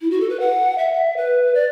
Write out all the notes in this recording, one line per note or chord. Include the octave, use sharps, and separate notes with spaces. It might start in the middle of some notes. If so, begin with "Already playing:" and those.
E4
F#4
A4
B4
F#5
E5
B4
D5